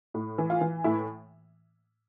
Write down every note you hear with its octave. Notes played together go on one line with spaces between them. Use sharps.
A2
E3
F4
E3
A2 E4